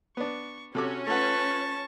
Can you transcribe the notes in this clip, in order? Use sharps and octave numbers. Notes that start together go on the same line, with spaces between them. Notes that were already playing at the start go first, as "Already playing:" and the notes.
B3 D4 C#6
C3 C#4 F#4 A4 D6
A3 F4 B4 F#5 A5 C#6